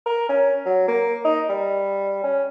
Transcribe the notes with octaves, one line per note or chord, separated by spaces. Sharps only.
A#4
C#4
F#3
A#3
D#4
G3
C#4